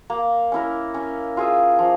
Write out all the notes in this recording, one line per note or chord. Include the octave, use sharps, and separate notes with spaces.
A#3
C#4 E4 A#4
C#4
F4 G#4 E5
F3